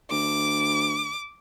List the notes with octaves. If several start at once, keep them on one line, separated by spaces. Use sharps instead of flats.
D2 D6